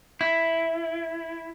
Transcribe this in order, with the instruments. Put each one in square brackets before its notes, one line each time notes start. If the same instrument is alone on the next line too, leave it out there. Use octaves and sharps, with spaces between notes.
[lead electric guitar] E4